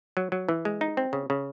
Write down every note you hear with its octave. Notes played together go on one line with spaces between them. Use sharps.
F#3
F#3
E3
G#3
D#4
C4
C#3
C#3